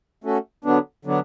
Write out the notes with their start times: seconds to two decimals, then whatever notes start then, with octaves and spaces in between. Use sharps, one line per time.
0.24 A3 C#4 F#4 A4
0.65 D3 F#3 B3 D4
1.05 D3 F#3 B3 D4